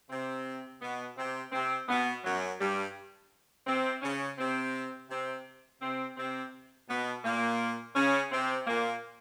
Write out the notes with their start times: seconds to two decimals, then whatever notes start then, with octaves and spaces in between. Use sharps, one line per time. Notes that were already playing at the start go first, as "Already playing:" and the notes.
0.10 C3 C4
0.82 B2 B3
1.17 C3 C4
1.52 C3 C4
1.88 B2 B3
2.24 F#2 F#3
2.59 G2 G3
3.67 C3 C4
4.02 C#3 C#4
4.38 C3 C4
5.09 C3 C4
5.81 C3 C4
6.17 C3 C4
6.89 B2 B3
7.24 A#2 A#3
7.95 C#3 C#4
8.31 C3 C4
8.67 A#2 A#3